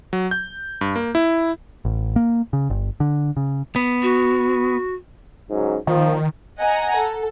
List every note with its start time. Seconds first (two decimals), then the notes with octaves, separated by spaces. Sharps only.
0.13 F#3
0.31 G6
0.81 G2
0.96 A#3
1.15 E4
1.85 A1
2.16 A#3
2.53 C#3
2.70 G1
3.00 D3
3.37 C#3
3.76 B3
4.03 F#4
5.49 G#2 C#3 F#3
5.87 A#2 D#3 F3
6.58 D#5 F#5 G#5 A#5
6.97 A4